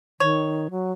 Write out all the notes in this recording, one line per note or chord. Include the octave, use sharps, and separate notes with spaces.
D#3 C#5
F#3